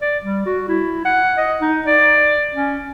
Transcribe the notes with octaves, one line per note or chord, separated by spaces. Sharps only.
D5
G3
F#4
E4
F#5
D#5
D#4
D5
C#4